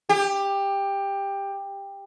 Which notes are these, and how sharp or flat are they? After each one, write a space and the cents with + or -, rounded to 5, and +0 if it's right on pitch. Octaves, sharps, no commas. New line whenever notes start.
G4 +15